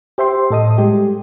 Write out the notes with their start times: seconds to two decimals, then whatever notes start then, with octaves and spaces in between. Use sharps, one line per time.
0.18 G4 C5 E5 G5 C6
0.50 A2 A4 D#5 D#6
0.78 G3 G#3 G4